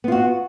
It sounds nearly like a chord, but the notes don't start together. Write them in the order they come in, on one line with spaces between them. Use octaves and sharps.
B3 F4 F#4